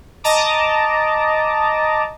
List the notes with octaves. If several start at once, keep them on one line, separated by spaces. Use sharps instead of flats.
D#5 A5 A#5 D6